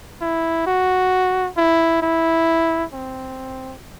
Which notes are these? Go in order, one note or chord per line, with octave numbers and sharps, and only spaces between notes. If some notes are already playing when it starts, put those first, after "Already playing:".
E4
F#4
E4
E4
C4